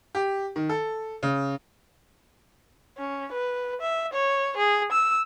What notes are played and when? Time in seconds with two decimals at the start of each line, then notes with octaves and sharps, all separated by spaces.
0.15 G4
0.56 D#3
0.69 A4
1.23 C#3
2.98 C#4
3.32 B4
3.81 E5
4.13 C#5
4.57 G#4
4.92 E6